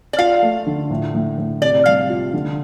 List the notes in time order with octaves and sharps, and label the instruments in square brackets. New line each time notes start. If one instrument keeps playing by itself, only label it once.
[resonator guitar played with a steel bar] D5
[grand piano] F4 [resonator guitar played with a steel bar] F5
[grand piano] A3
D3
A2
A2
A2
[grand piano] C3 [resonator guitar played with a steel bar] D5
[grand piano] G3 [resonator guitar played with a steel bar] F5
[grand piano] F4
D3